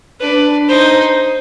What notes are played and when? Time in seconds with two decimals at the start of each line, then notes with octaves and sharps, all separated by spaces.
0.20 D4 B4
0.68 D#4 C5